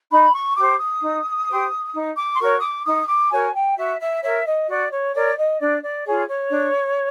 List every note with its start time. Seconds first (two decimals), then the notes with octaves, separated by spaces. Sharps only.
0.11 D#4 B5
0.34 C#6
0.56 G4 C5 D6
0.79 D#6
1.02 D#4
1.49 G4 C5
1.93 D#4
2.16 D6
2.33 C6
2.40 F#4 A#4 C#5 C#6
2.58 D#6
2.62 D6
2.85 D#4 D#6
3.08 D6
3.31 F#4 A#4 C#5 G#5
3.54 G5
3.77 F#4 E5
3.99 E5
4.22 A#4 C#5 E5
4.45 D#5
4.68 F#4 D5
4.91 C#5
5.14 A#4 C#5 D5
5.37 D#5
5.59 D4 D5
5.83 D5
6.05 F4 G#4 C#5
6.28 C#5
6.50 D4